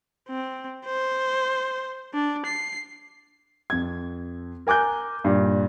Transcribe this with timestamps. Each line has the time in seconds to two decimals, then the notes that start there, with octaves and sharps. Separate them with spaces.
0.29 C4
0.86 C5
2.14 D4
2.46 C7
3.70 F2 G#6
4.67 A#4 G#5 D6 F#6 G6
5.24 G2 A#2